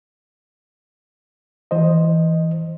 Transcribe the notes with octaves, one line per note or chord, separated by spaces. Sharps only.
E3 C5 D#5